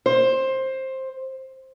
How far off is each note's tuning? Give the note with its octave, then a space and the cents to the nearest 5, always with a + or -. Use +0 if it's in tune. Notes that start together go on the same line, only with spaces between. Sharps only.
C5 +15